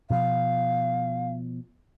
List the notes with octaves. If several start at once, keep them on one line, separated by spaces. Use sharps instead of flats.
B2 F3 F5